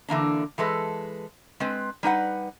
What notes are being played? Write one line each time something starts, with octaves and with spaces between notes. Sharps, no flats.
D3 E3 A#3 D4
E3 G#3 A4 B4
G#3 C4 B4
G3 D#4 B4 F#5